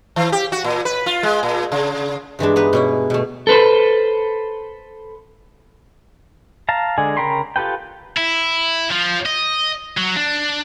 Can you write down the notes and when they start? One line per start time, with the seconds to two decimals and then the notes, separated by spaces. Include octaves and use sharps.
0.16 E3
0.32 G4
0.52 F#4
0.65 A#2
0.85 B4
1.06 F4
1.23 G#3
1.43 A#2
1.72 C#3
2.39 G2 E3 G#3 D4
2.56 B3 D#4 B4
2.73 B2 C#4 E4
3.10 B2 A3
3.47 A4 B4 C5
6.69 F5 A5 A#5
6.98 D3 G#3 G#4
7.17 C#3 A#4 G5 B5 C6
7.56 F4 G4 A4 B4 G5
8.17 E4
8.91 F3
9.26 D#5
9.98 F#3
10.16 D4